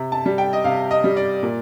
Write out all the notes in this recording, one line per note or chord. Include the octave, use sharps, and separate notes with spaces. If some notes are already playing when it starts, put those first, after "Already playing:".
Already playing: C3
A5
G3
G5
D#5
C3 F5
D#5
G3
D5
A#2